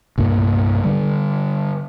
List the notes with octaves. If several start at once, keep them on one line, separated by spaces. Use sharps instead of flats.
C2 G2 A#2 A#3
D3 G3